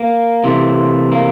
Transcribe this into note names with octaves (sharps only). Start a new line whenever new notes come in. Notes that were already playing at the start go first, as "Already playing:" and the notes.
Already playing: A#3
C3 E3 A3
A#3